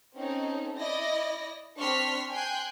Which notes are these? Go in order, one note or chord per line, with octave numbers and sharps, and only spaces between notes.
C4 C#4 D#4 A4
E4 D5 D#5 A#6
C4 D4 C6 C#6 F6 B6
G5 G#5 C6 F#6 G6